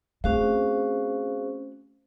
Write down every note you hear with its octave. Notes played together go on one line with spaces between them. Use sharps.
A3 C4 C#4 F#4 G#4 C5 F5